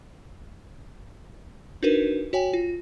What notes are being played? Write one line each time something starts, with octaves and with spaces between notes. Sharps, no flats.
D4 D#4 F#4 A#4 B4
F#4 C#5 G5 G#5
F4